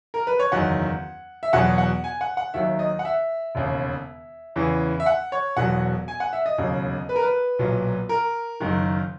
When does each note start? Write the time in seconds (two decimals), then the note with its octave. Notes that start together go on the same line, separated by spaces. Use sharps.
0.14 A#4
0.27 B4
0.39 C#5
0.52 F#1 E2 D#3 F#3 F#5
1.43 E5
1.53 E2 B2 F#3 F#5
1.78 F#5
2.04 G#5
2.21 F#5
2.37 F#5
2.54 D#2 D#3 F#3 E5
2.79 D#5
2.99 F#5
3.05 E5
3.55 E1 D#2 C#3
4.56 E2 C#3 E3
5.00 E5
5.06 F#5
5.32 C#5
5.57 E1 E2 B2 F#3 F#5
6.08 G#5
6.20 F#5
6.33 E5
6.46 D#5
6.58 E1 D#2 C#3 F#3
7.09 B4
7.16 A#4
7.23 B4
7.59 B1 A#2 F#3
8.09 A#4
8.60 F#1 F#2 D#3